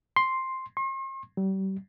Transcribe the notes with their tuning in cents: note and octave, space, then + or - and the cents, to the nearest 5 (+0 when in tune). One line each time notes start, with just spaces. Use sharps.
C6 +5
C6 +45
G3 -35